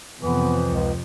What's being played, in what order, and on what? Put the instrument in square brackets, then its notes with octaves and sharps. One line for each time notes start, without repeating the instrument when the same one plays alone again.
[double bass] F2 C3 [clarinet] E3 [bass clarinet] B3
[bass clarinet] C#2